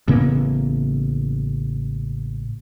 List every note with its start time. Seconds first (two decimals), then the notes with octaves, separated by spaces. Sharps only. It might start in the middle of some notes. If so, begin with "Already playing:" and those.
0.08 A1 C#3 A#3 B3